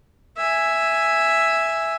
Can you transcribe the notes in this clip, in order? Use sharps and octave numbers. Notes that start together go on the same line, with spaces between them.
E5 G#5